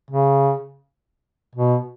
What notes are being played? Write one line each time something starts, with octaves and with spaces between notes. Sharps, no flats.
C#3
B2